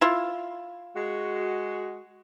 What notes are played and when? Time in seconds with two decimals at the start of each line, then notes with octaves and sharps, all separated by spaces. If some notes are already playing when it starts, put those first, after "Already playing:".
0.01 E4 F4
0.95 G#3 F#4